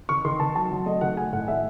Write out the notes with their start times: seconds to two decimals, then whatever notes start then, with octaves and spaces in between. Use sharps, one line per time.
0.09 D#3 C#6
0.25 D#3 C6
0.40 D#3 A5
0.56 F#3 A5
0.71 F#3
0.86 A3 D#5
1.01 D#3 F#5
1.17 A3 G#5
1.32 A2 F#5
1.47 A3 E5